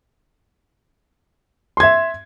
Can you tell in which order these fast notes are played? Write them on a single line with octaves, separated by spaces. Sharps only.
C6 G#6 E5